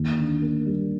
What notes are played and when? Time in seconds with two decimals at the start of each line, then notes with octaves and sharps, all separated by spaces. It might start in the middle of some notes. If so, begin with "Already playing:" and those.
Already playing: D#2
0.18 D3
0.42 A#3
0.66 G3